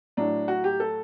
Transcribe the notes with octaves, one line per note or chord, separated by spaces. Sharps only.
A2 F#3 D4
F#4
G4
A4